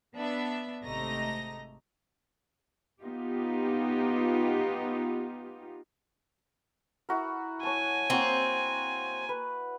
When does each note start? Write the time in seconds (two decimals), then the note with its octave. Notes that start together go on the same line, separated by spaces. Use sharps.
0.16 B3 D4 E5
0.83 G#1 C3 A3 D#5 A#5 A#6
3.02 B3 D#4 F4 G4
7.09 E4 F#4 A#4
7.63 C#5 G#5 A5
8.10 A#3 C4 F#4
9.29 B4